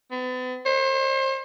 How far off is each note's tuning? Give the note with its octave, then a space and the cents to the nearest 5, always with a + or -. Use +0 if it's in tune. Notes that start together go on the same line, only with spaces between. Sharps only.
B3 +40
C5 +35